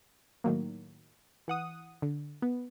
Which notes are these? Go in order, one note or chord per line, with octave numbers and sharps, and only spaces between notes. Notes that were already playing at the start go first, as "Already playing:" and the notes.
A2 D#3 F#3 A#3
E3 F#5 D#6
D3
B3